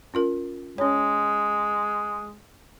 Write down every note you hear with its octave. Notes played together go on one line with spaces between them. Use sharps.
C#4 F4 A#4
G#3 C#4 C#5